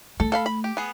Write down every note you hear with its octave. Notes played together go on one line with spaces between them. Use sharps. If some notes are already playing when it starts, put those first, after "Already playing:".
A3 A4
A4 F5 B5
B5
G4
B3 G#4